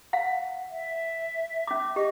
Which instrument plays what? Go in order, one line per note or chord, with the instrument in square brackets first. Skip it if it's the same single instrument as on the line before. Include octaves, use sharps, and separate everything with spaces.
[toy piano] F5 F#5
[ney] E5
[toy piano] C#4 D6
[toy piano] G4 [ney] D#5